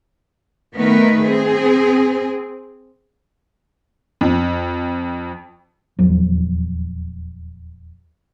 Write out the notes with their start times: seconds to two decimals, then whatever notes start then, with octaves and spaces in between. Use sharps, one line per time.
0.75 D#3 A3 B3 A#4 B4
1.23 C4 G#4
4.21 F2
5.99 D#1 E2 F3 F#3